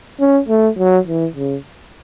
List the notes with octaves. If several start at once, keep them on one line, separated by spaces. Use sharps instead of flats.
C#4
A3
F#3
E3
C#3